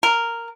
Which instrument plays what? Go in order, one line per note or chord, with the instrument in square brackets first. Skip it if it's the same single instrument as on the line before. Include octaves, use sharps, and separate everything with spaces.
[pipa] A#4